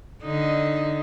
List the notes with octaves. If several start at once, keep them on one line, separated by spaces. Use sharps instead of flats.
D3 D#4